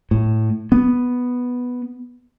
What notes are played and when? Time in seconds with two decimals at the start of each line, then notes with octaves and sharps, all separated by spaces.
0.11 A2
0.72 B3